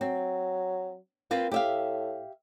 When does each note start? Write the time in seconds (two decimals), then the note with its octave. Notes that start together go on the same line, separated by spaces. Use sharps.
0.01 F#3 C4
1.31 A#3 C4 F4 B4
1.52 A2 G4 E5 F5